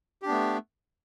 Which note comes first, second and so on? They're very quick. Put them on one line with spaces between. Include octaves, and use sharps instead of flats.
G4 D4 B3 A3